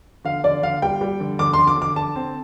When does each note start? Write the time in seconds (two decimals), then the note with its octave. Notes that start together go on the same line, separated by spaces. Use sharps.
0.25 D3 F5
0.44 D3 D5
0.62 D3 F5
0.82 G3 G5
1.01 G3
1.20 D3
1.39 D3 D6
1.54 D3 C6
1.67 D6
1.77 D3 D6
1.96 D3 A5
2.16 C4